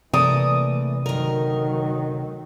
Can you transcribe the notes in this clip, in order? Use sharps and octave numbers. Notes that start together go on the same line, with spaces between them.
C3 E3 A3 A#3 D5 D#6
D2 D#3 F#3 A#4